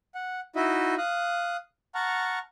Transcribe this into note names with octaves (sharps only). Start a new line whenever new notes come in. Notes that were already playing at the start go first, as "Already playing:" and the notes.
F#5
D#4 E4 F#4 D#5 E5
F5 D#6 F#6
F#5 A5 A#5 C#6 F6